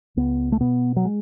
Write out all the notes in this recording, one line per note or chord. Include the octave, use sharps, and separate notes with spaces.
C#2 B3
A3
B2 B3
F#3
G#3